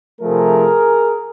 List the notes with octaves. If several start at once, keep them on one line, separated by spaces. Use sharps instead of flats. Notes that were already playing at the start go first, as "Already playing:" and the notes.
C3 F3 A3 G#4 A#4